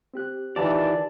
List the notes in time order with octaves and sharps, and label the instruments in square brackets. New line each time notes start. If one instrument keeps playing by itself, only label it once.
[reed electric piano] C4 G4 F#6
[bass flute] D#3 [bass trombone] E3 [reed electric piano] F4 G4 [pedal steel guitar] D5 A5